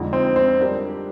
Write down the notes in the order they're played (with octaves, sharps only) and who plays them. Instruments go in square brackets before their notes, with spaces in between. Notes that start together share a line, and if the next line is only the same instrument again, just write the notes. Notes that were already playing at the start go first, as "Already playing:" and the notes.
Already playing: [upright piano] F2 D3 G#3 D#4
[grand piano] C4
C4
[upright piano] G3 D4 G4 A#4